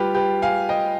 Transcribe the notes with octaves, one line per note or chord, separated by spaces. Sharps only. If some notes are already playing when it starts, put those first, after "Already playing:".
Already playing: G3 F4 G4 B4
G4 B4
F5 G#5
D#5 G5